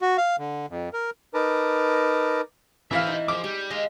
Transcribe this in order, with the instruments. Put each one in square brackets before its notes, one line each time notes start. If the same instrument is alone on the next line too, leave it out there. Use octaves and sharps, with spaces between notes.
[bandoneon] F#4
F5
D3
F2
A#4
[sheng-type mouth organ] D#4 A#4 B4 A5 A#5 D6
[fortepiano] E3 E4 F5 [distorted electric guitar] C5 E5
[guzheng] D#4
[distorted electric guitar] F3 [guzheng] G#4 [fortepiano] D6
[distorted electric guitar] G3 [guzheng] G4
[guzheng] G#3 [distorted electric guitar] D#5 F5